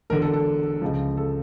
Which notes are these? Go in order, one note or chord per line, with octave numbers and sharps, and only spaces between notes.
E1 E2 D3 A#4
A4
A4
C#2 C#3 F3
A4